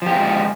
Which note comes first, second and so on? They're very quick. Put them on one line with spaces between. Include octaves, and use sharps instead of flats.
F3 G4 F4 G#3